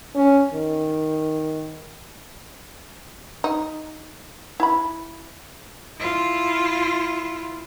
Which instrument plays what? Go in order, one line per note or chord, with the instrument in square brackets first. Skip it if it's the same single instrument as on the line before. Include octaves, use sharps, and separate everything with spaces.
[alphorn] C#4
D#3
[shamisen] D#4
E4 B5
[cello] E4 F4